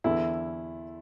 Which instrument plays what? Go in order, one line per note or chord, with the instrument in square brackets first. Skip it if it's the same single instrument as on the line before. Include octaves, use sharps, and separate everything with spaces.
[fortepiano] E2 D3 E4